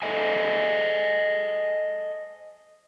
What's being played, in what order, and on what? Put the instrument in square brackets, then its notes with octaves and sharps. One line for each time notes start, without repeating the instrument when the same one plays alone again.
[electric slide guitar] A4 C5 D#5 E5 G#5